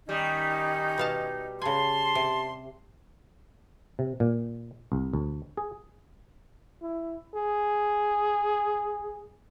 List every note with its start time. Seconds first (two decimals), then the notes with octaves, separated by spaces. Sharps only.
0.09 D#3 G3 C#4 D#4
0.98 B2 F5 A5
1.62 C#3 G#5 A5 C6
2.15 C3
3.99 C3
4.20 A#2
4.92 C2
5.13 D2
5.57 G#4
6.81 E4
7.34 G#4